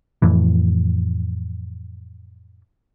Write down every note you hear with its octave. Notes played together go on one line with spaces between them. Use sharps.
F2 A2 E3